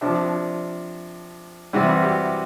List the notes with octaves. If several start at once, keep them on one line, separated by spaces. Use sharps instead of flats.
C3 F3 D4
C3 E3 G3 F#4
G4